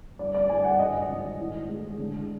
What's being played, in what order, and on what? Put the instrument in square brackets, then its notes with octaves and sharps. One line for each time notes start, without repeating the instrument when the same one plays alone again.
[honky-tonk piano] G1 D5
D5
G1 G#5
F#5
G#1 D#5
G#1
A2
G#3
D3